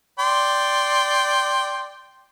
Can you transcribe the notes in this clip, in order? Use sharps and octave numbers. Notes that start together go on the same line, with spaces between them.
D5 G5 C6